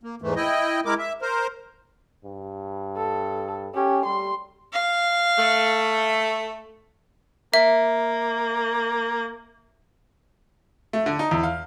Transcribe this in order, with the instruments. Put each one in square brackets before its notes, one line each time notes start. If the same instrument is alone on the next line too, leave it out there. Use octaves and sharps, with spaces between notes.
[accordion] A#3
E2 G#2 E3 A3
E4 D#5 G5
G#3 E4 A#4 D6
E5
A#4 C5
[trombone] G2
[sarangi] A4
[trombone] C#4 [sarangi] G4
[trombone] G3 [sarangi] C6
[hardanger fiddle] F5
[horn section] A3
[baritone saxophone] A#3 [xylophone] E5
[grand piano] A3
D3
D#4
E2
F5